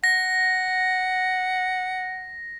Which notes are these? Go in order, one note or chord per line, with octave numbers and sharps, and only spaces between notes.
F#5 A#6